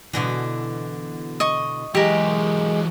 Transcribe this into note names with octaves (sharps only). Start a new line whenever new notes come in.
B2 D3 E3
D#5 C#6
E3 F#3 G#3 G4 A#4